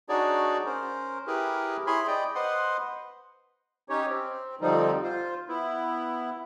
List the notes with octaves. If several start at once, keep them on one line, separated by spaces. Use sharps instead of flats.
D4 D#4 F#4 G#4 C#5 D5
C#4 A#4 C5
E4 G4 G#4 A#4 B4
E4 G#4 C#5 G#5 B5 C6
D5 D#5 G5
B4 C5 D#5 F#5 C6
C#4 D#4 G4 C#5
C4
F2 D3 F3 G3 C4 D#4
F4 C5
B3 E4